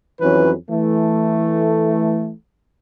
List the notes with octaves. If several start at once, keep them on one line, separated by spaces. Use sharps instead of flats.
F2 E3 F#3 C#4 B4
E3 A3